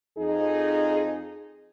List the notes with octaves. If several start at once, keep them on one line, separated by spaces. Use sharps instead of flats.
F2 D#4 G#4